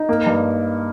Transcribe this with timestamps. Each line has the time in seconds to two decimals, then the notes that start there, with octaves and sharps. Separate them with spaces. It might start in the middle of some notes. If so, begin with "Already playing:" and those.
Already playing: D#4
0.09 A#3
0.26 G2